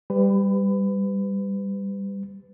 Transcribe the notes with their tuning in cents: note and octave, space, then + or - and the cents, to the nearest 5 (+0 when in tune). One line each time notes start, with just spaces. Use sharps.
G3 +10 B4 +30